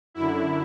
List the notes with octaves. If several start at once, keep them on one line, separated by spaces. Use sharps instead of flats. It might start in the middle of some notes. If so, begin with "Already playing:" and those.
F#2 D3 E4